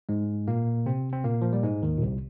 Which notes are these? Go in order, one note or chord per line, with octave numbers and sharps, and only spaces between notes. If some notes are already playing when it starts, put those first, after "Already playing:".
G#2 G#3
A#2 A#3
C3 C4
C4
A#2 A#3
F3
G3
G#2 G#3
D#2 D#3
A#2
C2 C3